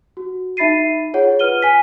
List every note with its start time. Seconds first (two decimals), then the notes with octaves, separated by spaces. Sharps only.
0.17 F#4
0.57 D#4 E5 B5 A6 C7 D#7
1.14 F4 G#4 C#5 F#5
1.39 F4 B4 F6 D#7 G7
1.61 G#5 B6 D#7